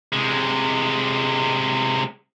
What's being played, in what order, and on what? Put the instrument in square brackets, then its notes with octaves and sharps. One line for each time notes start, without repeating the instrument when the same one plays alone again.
[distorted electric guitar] C3 G#3